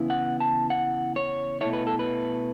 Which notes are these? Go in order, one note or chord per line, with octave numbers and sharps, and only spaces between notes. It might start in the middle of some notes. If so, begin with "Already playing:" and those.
Already playing: C#3 E3 B3 E4
F#5
A5
F#5
C#5
B2 A3 E4 C#5
B4
A4
B4